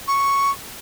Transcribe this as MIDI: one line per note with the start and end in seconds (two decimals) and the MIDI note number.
0.08 0.51 85